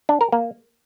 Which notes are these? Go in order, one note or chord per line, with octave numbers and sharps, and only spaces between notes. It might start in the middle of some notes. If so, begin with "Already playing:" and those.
D4
A#4
A#3